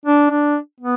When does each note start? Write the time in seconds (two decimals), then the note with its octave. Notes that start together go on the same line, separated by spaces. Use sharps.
0.06 D4
0.31 D4
0.80 B3